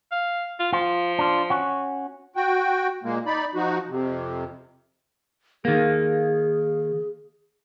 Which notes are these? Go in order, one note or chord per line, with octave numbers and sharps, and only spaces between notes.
F5
F4
F3 F4
D4 F4
C#4 F#4
F#4 G5
A#2 G#3 A#3
D#4 D5 B5
F3 D#4 F#4
F2 C3
D#3 A#3 G#4